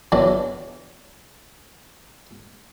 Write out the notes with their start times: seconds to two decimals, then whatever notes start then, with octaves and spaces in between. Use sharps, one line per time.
0.12 E2 E3 F#3 D4